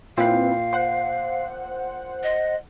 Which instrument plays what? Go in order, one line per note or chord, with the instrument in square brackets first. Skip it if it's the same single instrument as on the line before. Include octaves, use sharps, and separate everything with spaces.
[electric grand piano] A#2 F4 G5 [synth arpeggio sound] C4 E4 B4 [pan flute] F5
[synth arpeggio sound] C5 F#5
[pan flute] D#5